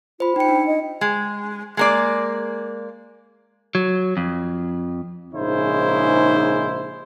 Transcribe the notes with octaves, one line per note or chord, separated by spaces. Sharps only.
F4 C5 B5
D#4 G5 C#7
D4
D#5
G#3
G#3 A#3 D5
F#3
F2
A#1 G#2 C#3 D#4 E4 C5